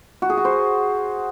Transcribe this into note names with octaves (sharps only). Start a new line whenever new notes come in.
F#4
G#4
F#4
C5